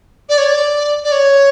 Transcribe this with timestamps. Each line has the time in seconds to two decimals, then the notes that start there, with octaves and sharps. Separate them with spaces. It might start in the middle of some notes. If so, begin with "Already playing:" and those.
0.29 D5
0.38 C#5
0.47 D5
1.04 D5
1.12 C#5